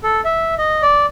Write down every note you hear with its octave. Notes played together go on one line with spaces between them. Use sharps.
A4
E5
D#5
D5